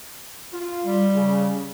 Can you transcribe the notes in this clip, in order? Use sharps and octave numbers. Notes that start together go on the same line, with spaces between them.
F4
G3
C#3